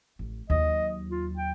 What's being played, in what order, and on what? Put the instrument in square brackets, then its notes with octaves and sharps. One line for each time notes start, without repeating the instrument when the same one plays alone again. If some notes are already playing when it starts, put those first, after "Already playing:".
[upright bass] A1
[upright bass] D#2 F#3 [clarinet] D#5
[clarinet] F4
G5